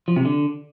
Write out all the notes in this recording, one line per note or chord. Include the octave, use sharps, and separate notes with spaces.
F3
C3
D3